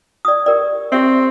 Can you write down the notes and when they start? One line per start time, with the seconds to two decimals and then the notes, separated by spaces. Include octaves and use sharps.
0.25 D5 D#6
0.46 G4 A#4 D5
0.92 C4 G4 E5